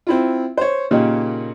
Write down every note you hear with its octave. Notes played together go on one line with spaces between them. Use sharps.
C4 E4 F4
C5 C#5
A#2 C#3 A#3 C#4 D#4 G4